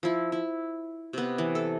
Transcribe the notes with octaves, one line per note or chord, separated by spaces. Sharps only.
F3 E4
E4
C3 B3
E3
A4